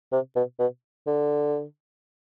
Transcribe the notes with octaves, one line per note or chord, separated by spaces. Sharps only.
C3
B2
B2
D3